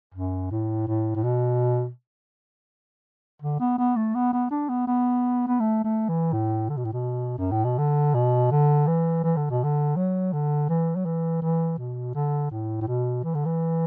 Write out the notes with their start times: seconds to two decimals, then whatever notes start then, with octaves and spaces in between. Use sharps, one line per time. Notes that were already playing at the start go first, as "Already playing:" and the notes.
0.14 F#2
0.51 A2
0.87 A2
1.15 A2
1.23 B2
3.42 D3
3.60 B3
3.78 B3
3.96 A3
4.14 B3
4.33 B3
4.50 D4
4.69 B3
4.87 B3
5.48 B3
5.60 A3
5.84 A3
6.08 E3
6.33 A2
6.69 D3
6.77 B2
6.84 A2
6.93 B2
7.38 F#2
7.51 A2
7.64 B2
7.78 D3
8.14 B2
8.51 D3
8.87 E3
9.24 E3
9.36 D3
9.50 B2
9.64 D3
9.96 F#3
10.32 D3
10.69 E3
10.96 F#3
11.05 E3
11.42 E3
11.78 B2
12.14 D3
12.51 A2
12.81 A2
12.87 B2
13.23 E3
13.34 D3
13.45 E3